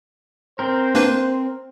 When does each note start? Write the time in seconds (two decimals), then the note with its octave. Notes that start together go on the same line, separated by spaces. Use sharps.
0.59 C4 A#4 C5
0.95 A#3 D4 B4